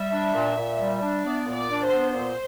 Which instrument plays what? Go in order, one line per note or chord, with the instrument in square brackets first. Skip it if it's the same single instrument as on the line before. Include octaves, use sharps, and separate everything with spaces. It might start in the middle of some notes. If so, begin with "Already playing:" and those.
Already playing: [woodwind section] G3 [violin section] E5
[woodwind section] D4
A#2
A#2
G3
D4
[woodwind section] B3 [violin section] D5
[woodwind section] A#2
[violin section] D5
[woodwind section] D4
[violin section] C5
[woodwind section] B3
[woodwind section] A#2 [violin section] C5